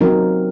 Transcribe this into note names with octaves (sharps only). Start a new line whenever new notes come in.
F#3 C4 D#4 A#4